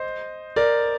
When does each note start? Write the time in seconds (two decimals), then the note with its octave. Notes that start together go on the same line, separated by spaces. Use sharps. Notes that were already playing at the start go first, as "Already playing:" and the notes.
Already playing: C5 D#5
0.56 A#4 D5